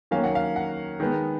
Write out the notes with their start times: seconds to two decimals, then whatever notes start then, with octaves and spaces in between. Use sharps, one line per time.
0.11 D#3 F#3 A#3 C#4 F5
0.24 F#5
0.35 F5
0.56 F#5
1.00 D#3 G#3 B3